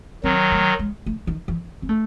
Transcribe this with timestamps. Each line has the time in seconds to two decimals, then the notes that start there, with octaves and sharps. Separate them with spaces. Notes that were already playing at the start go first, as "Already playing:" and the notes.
0.23 D#3 F#3 C4
0.52 A3
0.79 G#3
1.06 A3
1.27 D#3
1.48 E3
1.82 C4
1.89 A3